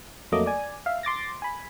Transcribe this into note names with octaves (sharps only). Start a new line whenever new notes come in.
F2 F#3 A3 A#3 D#5 D6
D5 G#5
E5 F5
C6 D6 A6 A#6
G#5 B5